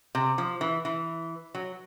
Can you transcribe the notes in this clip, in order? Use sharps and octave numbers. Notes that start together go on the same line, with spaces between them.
C3
F3
E3
E3
F#3